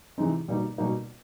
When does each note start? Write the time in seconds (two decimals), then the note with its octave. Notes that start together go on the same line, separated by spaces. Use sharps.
0.18 C3 E3 G#3 C4 D#4
0.48 B2 G3 A#3 D#4
0.78 B2 G3 A#3 D#4